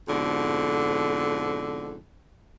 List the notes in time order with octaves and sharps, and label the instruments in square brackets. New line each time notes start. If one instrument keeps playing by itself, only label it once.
[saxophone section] F2 G#2 B2 D3